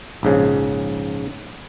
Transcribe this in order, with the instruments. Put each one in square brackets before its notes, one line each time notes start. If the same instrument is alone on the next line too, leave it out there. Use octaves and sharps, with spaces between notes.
[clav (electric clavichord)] A#1 G#2 C#3